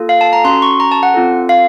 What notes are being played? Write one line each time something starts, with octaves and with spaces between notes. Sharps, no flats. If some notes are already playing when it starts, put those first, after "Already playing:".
Already playing: A#3 F4 A4
F5
A5
A#5
C#4 F#4 A4 C6
C#6
A#5
A5
F#5
C4 F4 A4
F5